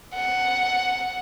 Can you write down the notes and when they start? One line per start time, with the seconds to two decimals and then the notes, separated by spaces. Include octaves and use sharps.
0.14 F#5